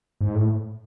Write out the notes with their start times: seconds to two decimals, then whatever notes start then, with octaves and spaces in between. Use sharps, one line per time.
0.21 G#2
0.35 A2